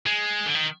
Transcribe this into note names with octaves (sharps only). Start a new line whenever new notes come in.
G#3
D3
D#3